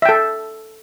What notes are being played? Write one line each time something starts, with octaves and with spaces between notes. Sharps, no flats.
A4 E5 G5